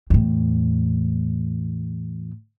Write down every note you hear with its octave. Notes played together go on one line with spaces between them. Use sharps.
E2 A2